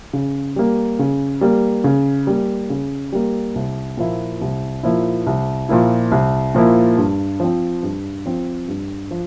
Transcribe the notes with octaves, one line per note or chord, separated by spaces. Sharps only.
C#3
G3 A#3
C#3
G3 A#3
C#3
G3 A#3
C#3
G3 A#3
C2
A#2 F3 A#3 E4
C2
A#2 F3 A#3 E4
C2
A#2 F3 A#3 E4
C2
A#2 F3 A#3 E4
G2
F3 C4
G2
F3 C4
G2
F3